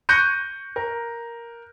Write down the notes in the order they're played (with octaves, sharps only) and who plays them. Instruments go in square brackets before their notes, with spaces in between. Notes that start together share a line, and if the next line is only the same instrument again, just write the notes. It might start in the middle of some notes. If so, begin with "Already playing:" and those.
[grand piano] C#6 F#6 G6 A#6 C#7 D#7
A#4